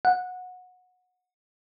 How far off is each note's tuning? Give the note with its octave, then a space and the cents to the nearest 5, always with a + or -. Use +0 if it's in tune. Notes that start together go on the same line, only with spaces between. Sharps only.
F#5 -20